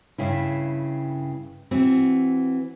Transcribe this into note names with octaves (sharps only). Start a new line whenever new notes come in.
G2 C#3 E4
E3 C4 F#4